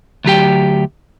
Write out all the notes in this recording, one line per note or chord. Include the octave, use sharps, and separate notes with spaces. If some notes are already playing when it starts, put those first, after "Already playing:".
D2 F#3 G4 G5